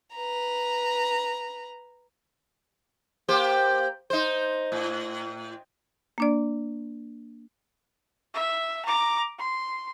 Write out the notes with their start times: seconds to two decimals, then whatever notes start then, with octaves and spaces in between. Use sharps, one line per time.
0.15 B4 A#5
3.28 A#3 G4 C5
4.10 D#4 C5
4.72 A2
6.18 A#3 D4 D5
8.34 E5
8.85 A#5 D6
9.39 C6